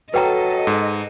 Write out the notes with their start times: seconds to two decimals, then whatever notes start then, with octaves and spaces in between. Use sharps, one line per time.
0.14 F#3 A4 B4 D#5 G5 A#5
0.67 G#2